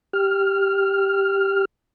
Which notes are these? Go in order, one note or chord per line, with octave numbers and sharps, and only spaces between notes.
G4 F6